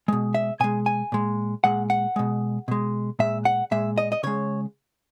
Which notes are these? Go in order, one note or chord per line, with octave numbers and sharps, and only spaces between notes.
B2 G#3
E5
B2 G#3 G#5
G#5
A#2 G#3
A#2 G#3 F#5
F#5
B2 G#3
B2 G#3
A#2 G#3 E5
F#5
A#2 G#3 E5
D#5
D#5
C#3 G#3 C#5